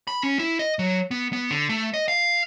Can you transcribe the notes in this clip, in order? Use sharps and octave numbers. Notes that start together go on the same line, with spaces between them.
B5
C#4
E4
D#5
F#3
B3
B3
D3
A3
D#5
F5